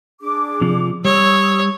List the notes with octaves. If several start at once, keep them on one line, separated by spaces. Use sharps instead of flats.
D4 G#4 D6
C3 F3
G3 C#5 D#6 E6